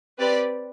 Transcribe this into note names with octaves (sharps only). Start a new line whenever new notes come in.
C4 G4 B4 D5